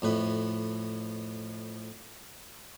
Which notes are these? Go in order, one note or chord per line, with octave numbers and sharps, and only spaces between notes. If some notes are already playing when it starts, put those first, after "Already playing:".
F2 A2 B4